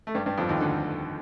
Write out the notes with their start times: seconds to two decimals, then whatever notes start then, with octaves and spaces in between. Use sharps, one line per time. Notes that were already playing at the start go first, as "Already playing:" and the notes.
0.07 A3
0.15 G2 G3
0.26 G2 G3
0.38 F2 F3
0.49 D#2 D#3
0.60 D2 D3